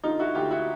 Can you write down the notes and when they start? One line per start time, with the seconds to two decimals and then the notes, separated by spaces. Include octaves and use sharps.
0.04 D3 D#4 F4
0.19 E4 F#4
0.35 D2 F4 G4
0.50 E4 F#4